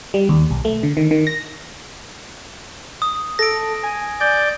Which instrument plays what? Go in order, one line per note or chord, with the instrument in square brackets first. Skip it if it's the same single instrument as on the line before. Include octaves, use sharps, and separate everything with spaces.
[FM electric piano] G3
D#2
B1
A3
D3
D#3
D#3
A#6
[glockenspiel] D#6
[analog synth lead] A4 [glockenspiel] A#6 D7
[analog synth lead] G#5
[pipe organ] D5 G6